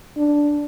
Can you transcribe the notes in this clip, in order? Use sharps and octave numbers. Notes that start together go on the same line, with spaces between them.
D4